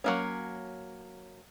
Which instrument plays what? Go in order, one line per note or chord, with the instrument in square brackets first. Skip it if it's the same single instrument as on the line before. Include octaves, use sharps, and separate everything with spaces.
[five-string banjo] F#3 A#3 C#4